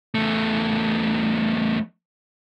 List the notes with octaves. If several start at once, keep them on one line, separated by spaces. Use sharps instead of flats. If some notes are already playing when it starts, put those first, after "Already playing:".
E2 A3